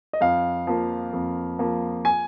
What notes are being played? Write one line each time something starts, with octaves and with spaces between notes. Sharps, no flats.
D#5
F2 F5
F3 A#3
F2
F3 A#3
G#5